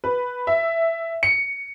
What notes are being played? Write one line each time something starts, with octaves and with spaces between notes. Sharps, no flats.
B4
E5
C#7